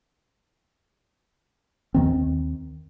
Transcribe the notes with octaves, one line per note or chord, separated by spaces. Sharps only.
D#2 D#3 C4